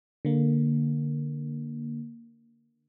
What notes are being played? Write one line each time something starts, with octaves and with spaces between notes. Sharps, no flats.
D3 A#3